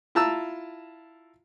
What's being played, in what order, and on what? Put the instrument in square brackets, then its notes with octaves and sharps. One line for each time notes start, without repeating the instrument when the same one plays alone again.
[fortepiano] E4 F4 A5 A#5 E6